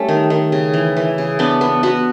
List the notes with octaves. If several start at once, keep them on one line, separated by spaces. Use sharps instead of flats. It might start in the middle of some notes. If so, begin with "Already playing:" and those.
Already playing: G3 A3 C#4
D#3
D#3
C#3
E3
E3
C#3
B3 D4
B3
B3 F#4